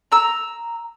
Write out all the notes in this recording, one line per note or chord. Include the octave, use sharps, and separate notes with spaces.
A#5 E6